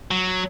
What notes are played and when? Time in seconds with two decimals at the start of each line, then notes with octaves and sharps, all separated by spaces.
0.11 F#3